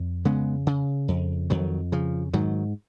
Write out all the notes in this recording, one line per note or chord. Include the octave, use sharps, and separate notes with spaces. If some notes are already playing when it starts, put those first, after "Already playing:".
Already playing: F2
C#3 G#3 B3
C#3
F2
F2 D#3 F#3
C#3 F3
G#2 D#3 F#3